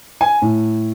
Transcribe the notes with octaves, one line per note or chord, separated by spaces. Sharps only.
G#5
A2